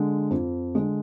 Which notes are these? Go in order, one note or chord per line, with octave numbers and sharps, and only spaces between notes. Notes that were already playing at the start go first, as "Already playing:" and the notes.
Already playing: D3 G#3
F2
D3 G#3